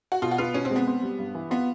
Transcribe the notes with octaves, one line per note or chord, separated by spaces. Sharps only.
F#4
B2 F4
F#4
B3 F4
B2 C#4
C4
G#3
B3
C4
G3
G2
E3
B3 F4